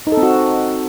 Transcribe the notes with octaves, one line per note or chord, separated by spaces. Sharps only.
D#4
A4
C4
F#4